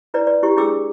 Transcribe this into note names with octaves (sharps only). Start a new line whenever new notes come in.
E4 B4 D5
D5
E4 G4 C#6
D4 E4 G#4 G5 D6 E6